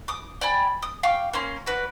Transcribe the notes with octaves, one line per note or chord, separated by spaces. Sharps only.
D6 D#6
D5 G5 G#5 B5
D#6
F5 G5 C#6 D6
A#3 C#4 C6
F#4 B4 D5